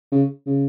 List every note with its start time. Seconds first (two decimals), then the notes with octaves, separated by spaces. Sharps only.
0.12 C#3
0.46 C#3